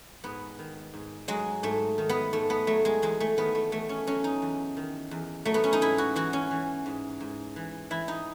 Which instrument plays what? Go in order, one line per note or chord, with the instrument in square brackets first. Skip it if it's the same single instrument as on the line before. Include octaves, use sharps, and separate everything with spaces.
[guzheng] G#2 B3
D#3
G#2
F#3 G#3
G#2 A3
D#3
B3
G#2 A3
B3
F#3 A3
G#3
E2 G#3
A3
D#3 B3
A3
E2 A3
C#4
F#3 C#4
D#4
E2
D#3
E2
F#3 A3
B3
C#4
D#4
G#2 E4
F#4
E3 F#4
C#4
E3
G#2
G#2
E3
E3 E4
D#4